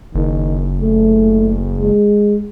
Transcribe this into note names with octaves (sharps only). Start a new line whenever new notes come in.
F#1 D#3
A3
G#3